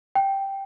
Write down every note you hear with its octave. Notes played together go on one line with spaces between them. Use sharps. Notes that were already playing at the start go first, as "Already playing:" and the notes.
G5